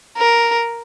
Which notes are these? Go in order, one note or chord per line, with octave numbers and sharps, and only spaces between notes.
A#4